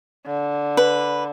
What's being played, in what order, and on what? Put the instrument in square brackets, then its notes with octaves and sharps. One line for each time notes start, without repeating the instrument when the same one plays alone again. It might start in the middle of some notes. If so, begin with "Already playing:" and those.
[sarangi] D3
[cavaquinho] B4